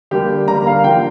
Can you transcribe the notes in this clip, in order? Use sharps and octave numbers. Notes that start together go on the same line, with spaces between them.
D3 G3 A#3 G4
D3 G3 A#3 A#5
F5
D3 F3 A#3 G5